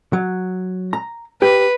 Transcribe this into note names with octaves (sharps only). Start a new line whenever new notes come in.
F#3
A#5
G4 B4